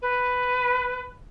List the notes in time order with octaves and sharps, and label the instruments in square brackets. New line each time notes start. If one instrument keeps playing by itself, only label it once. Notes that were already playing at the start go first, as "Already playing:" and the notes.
[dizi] B4